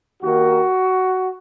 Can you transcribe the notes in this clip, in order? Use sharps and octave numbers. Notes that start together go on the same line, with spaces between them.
D#2 D#3 A#3 F#4